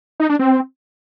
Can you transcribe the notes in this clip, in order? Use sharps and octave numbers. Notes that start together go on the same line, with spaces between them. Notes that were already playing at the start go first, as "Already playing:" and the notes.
D#4
D4
C4